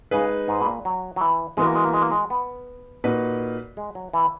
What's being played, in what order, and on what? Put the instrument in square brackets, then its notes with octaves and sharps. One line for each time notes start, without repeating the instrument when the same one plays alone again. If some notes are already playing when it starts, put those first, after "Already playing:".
[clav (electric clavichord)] C#3 [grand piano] G#3 D#4 G#4 B4
[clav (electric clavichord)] G#2
B2
A#2
F#3
F#3
E3
[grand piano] E3 B3 F#4 A#4 [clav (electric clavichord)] G#3
[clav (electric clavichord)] A#3
G#3
A#3
G#3
A#3
G#3
B3
[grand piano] A#2 A#3 D#4 F#4 B4
[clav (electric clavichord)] G#3
F#3
E3